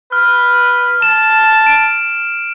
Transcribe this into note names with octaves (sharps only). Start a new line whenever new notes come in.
B4 F6
A5 E7
D7